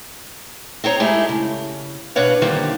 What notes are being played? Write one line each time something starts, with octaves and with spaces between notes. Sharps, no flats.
C4 D#4 C#5 A#5
G#3 A3 D#4 E4 G4 G#4
C#3
B2 D4 B4 C#5 F5
D3 D#3 F3 G3 A3 A#3